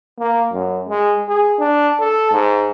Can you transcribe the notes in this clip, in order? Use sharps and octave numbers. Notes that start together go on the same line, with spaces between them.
A#3
F#2
G#3
G#4
D4
A4
G#2